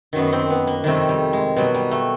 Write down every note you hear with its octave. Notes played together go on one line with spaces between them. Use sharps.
F#2 D#3 F#3 B3
C4
B3
A#3
F2 C3 D#3 G3 A3
G3
G#3
B2 F#3 G3
G3
A3